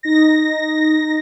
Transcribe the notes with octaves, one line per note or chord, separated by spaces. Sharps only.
D#4 A#6